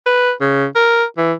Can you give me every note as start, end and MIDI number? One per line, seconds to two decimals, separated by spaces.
0.06 0.32 71
0.41 0.66 49
0.75 1.04 70
1.18 1.33 52